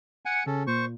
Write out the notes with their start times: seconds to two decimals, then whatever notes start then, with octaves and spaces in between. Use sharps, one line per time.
0.25 F#5 G#5 C#7
0.46 C#3 C#4 A4
0.67 A#2 C5 C#6